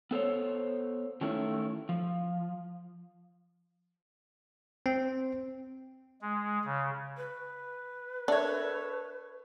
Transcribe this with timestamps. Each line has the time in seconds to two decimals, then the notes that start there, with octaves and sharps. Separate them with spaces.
0.11 B3 A4 C5 C#5
1.21 D#3 A3 C#4 E4 A4
1.89 F3
4.86 C4
6.22 G#3
6.65 C#3
7.17 B4
8.28 D4 A4 A#4 C#5 E5 A5